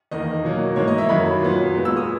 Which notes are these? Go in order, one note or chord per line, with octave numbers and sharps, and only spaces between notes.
E2 D#3 A#3 D#5
B2 F#3 A#3
G#2 E3 A#3 C#5
D#5
E5
F#2 D#3 F#3 A#3 B5
A#2 F#3 B3
A#2 G#3 B3
E6
D#6